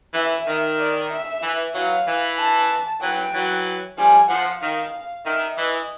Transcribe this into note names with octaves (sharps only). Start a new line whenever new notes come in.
E3 E5
D#3
D5
E5
E3
E3 F#3 F5
E3
A5
E3 F#3 G5
E3 F#3
F3 G3 G#5
F3 F#5
D#3 F5
D#3 E5
E3 D#5